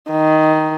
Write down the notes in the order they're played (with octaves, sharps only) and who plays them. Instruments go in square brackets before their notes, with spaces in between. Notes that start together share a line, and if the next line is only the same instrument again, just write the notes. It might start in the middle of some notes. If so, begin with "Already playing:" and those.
[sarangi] D#3